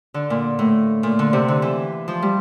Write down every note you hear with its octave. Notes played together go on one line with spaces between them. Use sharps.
D3
A#2
A2
A#2
D3
C3
D3
E3
F3
G3